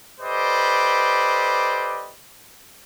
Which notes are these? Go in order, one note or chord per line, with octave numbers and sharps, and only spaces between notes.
G4 A4 B4 C5 D5 D#5